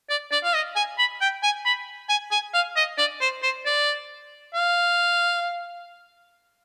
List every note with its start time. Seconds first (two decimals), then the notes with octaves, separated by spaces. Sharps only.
0.10 D5
0.32 D5
0.44 F5
0.54 D#5
0.76 G#5
0.98 B5
1.21 G5
1.43 G#5
1.66 B5
2.09 G#5
2.32 G#5
2.54 F5
2.76 D#5
2.98 D5
3.21 C5
3.43 C5
3.65 D5
4.54 F5